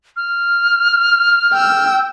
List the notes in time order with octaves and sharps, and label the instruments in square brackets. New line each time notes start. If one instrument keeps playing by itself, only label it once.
[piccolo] F6
[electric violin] G5 E6